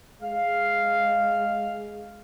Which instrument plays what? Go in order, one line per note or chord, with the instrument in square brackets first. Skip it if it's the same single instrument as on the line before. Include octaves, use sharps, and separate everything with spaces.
[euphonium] G#3 [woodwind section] F5